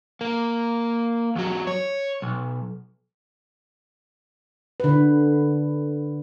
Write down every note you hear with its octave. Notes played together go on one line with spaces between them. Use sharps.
A#3
E2 F#3
C#5
B1
D3 B4